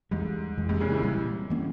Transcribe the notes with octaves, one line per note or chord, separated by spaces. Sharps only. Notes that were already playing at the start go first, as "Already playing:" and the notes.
E2 G#2 E3 G3
F2 E3 G#3
G#2 C3
A#2 C#3
C3 E3
A#2 G3 A#3
E3 A#3 C#4